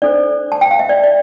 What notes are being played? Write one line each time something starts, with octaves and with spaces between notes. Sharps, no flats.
D4 A4 C5 D5
A5
G5
F5
E5
D5
D5